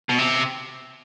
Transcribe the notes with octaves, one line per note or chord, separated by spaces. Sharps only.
B2
C3